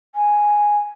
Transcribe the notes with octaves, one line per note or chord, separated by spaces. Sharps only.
G#5